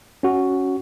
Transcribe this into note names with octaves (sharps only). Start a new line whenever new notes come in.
C#4 F#4